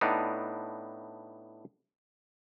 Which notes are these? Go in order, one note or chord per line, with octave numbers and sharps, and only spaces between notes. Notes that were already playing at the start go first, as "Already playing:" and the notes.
A2 B3 D4 D#4